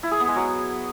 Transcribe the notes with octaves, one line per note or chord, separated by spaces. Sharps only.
E4
G#4
B3
G#3
F#3